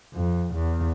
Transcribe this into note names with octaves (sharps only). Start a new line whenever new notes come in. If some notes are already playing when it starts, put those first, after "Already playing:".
F2
E2